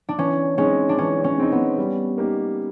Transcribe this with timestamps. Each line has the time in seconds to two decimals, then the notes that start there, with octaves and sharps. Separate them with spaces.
0.09 D4
0.18 E3 C#4
0.58 G#3 C4 C#4 D#4
0.89 D4
0.98 E3 C#4
1.24 C#4
1.38 G#3 C4 D#4
1.52 B3
1.78 G3
2.18 A#3 D#4 G4